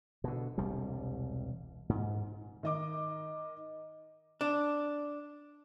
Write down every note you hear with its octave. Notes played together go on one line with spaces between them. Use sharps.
B2 D3
E1 C2 G3
G#2
D#3 D#5 D6
D4